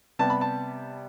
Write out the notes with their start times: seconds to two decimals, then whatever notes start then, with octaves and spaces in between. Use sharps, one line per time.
0.19 C3 G3 B3 A5
0.30 B5
0.41 A5